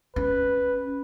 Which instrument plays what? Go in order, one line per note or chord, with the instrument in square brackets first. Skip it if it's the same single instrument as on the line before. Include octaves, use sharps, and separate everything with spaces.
[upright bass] C#4 [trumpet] B4